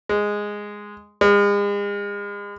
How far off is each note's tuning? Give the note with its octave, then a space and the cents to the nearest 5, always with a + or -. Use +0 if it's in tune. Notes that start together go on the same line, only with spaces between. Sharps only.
G#3 -5
G#3 -40